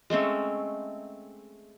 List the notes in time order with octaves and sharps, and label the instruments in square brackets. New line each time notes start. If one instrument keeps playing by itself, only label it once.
[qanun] G#3 A3 C4 C#4